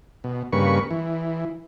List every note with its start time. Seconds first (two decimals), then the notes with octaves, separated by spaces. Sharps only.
0.24 B2
0.53 G2 C#3 A#3 B4 C#6
0.91 E3